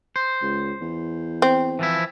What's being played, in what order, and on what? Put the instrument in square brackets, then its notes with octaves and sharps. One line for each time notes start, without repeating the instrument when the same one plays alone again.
[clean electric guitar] C5
[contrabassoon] C#2
E2
[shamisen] C4
[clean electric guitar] E3 F3 E4